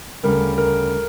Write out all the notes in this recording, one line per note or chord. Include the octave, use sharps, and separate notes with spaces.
D2 C#3 G3 A#4
A#4